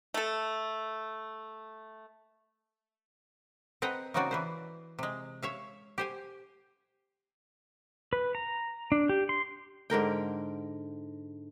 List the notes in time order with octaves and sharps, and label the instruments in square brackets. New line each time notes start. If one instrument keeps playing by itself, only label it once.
[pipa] A3 A4
[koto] C4 B4 D#5 F#5 A#5
C#3 A#3 C4 D#4 F#4 D5
E3 B4 C5
C3 G#3
C#5 E5 F5
G4 C5 G#5
[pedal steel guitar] B4
A#5
D4
G4
C6
[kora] G#2 D3 A#4 G5